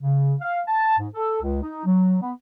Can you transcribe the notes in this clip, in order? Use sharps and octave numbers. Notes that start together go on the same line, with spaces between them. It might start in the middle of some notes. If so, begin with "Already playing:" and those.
C#3
F5
A5
G#2
A4
C#2
D#4
F#3
B3